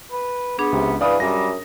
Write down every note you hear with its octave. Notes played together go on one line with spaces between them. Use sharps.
B4
B3 D4 G#4
C#2 C3
E3 B4 D5 F5 D#6
F#2 G3 A#6